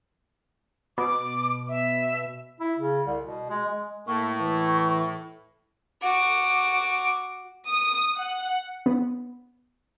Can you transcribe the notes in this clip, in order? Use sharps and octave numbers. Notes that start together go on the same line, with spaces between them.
B2 D6
E5
E4
C#3
C2
B2
G#3
G#3
A2 A#3 C#6
E3
F#4 D6
D#6
F#5
B3